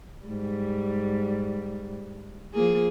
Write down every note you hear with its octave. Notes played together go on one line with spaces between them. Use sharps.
G#2 G3
F3 A#3 G#4